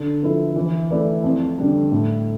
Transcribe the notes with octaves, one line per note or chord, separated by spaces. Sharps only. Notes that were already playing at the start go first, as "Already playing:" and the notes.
Already playing: D3
F3 B3 E4 A4
E3
A3 E4 B4 D5
F2
D3 G3 D4
A2